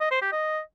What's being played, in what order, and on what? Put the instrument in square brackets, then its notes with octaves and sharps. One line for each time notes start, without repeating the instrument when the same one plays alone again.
[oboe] D#5
C5
G4
D#5